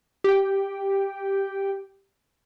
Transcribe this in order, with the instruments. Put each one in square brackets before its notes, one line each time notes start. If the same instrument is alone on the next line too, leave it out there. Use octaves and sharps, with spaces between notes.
[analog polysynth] G4 G5